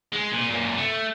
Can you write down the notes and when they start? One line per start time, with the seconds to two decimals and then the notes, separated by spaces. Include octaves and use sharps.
0.12 G#3
0.31 A#2
0.49 F#2 A#2
0.77 A3